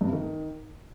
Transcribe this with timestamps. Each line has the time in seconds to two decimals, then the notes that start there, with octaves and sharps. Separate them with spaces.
0.01 G2
0.07 C3
0.13 D#3